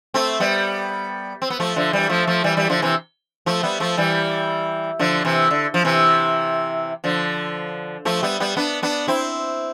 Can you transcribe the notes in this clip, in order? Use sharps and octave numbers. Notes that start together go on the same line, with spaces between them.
A3 C4
G3 B3
C4
B3
F3 A3
D3 F3
E3 G3
F3 A3
F3 A3
E3 G3
E3 G3
D3 F3
C3 E3
F3 A3
G3 B3
F3 A3
E3 G3
D3 F3
C3 E3
D3
F3
C3 E3
D3 F3
F3 A3
G3 B3
G3 B3
B3 D4
B3 D4
C4 E4